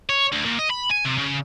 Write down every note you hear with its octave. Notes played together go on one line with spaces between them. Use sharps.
C#5
D2
A#2
D#5
B5
G#5
C3
C#3